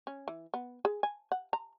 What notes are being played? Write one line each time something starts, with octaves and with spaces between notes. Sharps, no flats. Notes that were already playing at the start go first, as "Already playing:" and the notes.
C#4
E3
B3
G#4
G#5
F#5
A#5